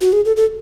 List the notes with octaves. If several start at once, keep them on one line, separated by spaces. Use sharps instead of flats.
F#4
G#4
A4
A4